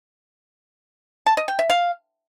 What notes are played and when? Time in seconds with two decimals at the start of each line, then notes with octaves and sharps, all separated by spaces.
1.26 A5
1.37 D#5
1.48 G5
1.59 E5
1.70 F5